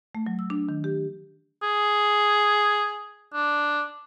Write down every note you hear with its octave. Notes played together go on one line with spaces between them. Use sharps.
A3
F#3
E6
D4
D#3
G4
G#4
D4